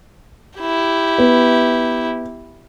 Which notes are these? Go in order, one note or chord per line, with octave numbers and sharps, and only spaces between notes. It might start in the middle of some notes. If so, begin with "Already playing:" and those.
E4 G4
B3